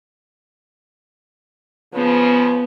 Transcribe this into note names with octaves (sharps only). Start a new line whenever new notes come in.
C#3 F3 B3